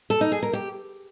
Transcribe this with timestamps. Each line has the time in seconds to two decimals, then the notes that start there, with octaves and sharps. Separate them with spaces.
0.10 A4
0.21 D#4
0.32 G#4
0.43 A#4
0.53 G4